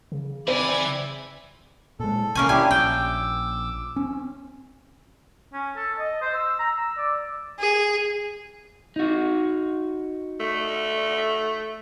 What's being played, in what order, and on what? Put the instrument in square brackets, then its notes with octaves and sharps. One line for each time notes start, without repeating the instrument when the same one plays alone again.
[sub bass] C#3
[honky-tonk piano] C4 [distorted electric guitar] E4 G#5 [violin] D5 G#6
[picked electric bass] A#2 G#3 [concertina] A4
[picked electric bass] C2 [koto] A#3 C#4 G#5
[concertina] D4 E4 G4 [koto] G#5
[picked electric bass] A#1 [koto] G5 [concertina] D6 E6
[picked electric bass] C4 C#4
[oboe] C#4
A4
D#5
C5
E6
A#5
E6
D5
[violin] G#4
[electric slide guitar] D#4 F#4
[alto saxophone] A3